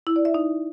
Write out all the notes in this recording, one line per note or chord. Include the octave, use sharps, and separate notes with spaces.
E4
D5
E5
D#4